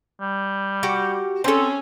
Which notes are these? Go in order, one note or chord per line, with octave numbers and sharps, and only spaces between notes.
G3
F#4 G4 F#5
C4 C#4 A4